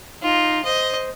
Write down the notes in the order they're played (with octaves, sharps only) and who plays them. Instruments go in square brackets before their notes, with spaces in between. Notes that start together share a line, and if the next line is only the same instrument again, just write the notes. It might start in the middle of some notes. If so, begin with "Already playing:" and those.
[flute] D#4 [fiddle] F4
[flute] C5 [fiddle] D#5